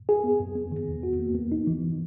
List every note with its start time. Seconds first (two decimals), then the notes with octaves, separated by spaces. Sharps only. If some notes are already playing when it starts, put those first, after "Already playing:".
0.09 G#4
0.24 B3
0.40 F#2
0.55 B3
0.72 D#3
0.88 E2
1.03 F#4
1.19 A#3
1.35 B3
1.52 D#4
1.67 E3